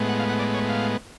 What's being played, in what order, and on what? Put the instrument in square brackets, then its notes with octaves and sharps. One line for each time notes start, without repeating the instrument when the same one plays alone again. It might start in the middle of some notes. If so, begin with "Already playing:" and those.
Already playing: [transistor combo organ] A2 G#3 B3
F#5
F5
F#5
D5
C#5
F5